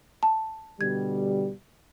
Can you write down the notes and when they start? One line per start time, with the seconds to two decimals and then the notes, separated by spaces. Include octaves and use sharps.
0.23 A5
0.81 B2 D3 G3 G#6